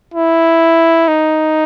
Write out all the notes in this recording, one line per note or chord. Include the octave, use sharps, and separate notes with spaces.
E4
D#4